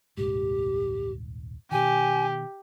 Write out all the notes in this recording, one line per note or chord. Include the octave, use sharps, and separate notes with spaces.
D#1 C2 G#2 G4
B2 D#3 G4 G#5